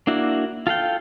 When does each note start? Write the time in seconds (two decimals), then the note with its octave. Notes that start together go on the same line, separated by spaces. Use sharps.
0.07 A#3 D4 E4 F#4
0.67 F4 A4 F5 G5